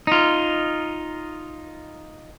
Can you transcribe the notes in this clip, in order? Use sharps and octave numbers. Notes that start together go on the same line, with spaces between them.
D#4 F4